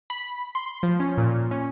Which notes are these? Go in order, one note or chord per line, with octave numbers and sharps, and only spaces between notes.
B5
C6
F3
C#4
A#2
C#4